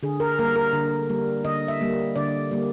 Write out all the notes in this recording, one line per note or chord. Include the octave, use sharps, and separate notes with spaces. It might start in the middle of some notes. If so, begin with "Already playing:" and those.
D3 G#4
A#4
G3 A#3 A#4
A#4
D3
G3 A#3
D3 D#5
E5
G3 A#3
D3 D5
G3 A#3